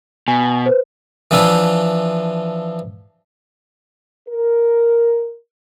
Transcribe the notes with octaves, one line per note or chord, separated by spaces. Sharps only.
B2 G#5
B4 C5
E3 F3 D4 E4 F4
A#4